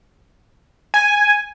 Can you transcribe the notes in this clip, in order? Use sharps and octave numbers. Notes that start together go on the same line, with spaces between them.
G#5